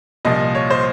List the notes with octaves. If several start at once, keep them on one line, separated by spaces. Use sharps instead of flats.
C2 A#2 F3 D#5
C#5
C5